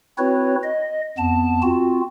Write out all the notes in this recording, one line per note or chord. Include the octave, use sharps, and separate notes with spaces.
C4 E4 F#4 B4 C#5
D#5
F2 B3 A5
C4 F4 F#4